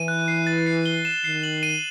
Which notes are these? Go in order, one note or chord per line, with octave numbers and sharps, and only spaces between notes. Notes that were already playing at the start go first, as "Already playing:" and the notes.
Already playing: E3 D#7
F#6
C7
A6
C7
G7
E7
D#3 C7
F#7
D#7